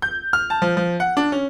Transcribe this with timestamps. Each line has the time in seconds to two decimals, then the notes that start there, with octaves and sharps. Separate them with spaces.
0.02 G6
0.33 F6
0.50 A5
0.62 F3
0.77 F3
1.00 F#5
1.17 D4
1.32 C#4